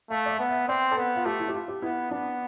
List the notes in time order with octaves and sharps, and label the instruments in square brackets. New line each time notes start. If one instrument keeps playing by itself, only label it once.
[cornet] A3 [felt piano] F5
[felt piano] D5
E5
[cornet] B3
[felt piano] E5
[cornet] C4 [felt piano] D5
[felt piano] A4
[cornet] B3 [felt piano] B4
[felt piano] F4
[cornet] A3 [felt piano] G4
[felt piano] E4
G4
F4
G4
[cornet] B3 [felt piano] E4
[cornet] B3 [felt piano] D4